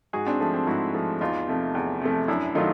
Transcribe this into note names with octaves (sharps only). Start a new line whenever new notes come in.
G#2 F#4 G#4
C4 D4
F3 A3
C4
G#2 E4 F#4
F3 A3
E2 D#4 F4
C3 F3 A3
E2
C3 F3 A3
F#2 D4 E4
D#3 F#3 A3 D#4 F4